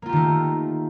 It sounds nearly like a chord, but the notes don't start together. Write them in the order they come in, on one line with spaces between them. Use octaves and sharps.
A#3 F4 G4 D#3 A3